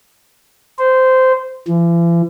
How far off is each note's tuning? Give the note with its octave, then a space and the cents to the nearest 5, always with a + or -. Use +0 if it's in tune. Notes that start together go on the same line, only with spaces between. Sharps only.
C5 -15
E3 +45